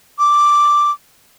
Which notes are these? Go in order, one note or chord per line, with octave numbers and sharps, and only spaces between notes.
D6